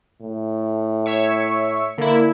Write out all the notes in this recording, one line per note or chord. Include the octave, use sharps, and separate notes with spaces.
A2
C#5 E5 C#6
D3 A#3 E4